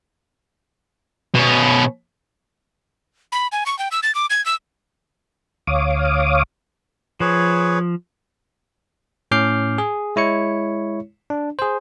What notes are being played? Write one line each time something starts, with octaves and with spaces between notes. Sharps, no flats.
B2 C#4
B5
G#5
C#6
G5
E6
A6
D6
G#6
E6
D2 C#5 F5 D6 D#6
F3 G#4 B4 C#5
A2 C#4 D6 F6 G6 C7
G#4
G#3 E4 C#5 C#7
D4
G#4 C5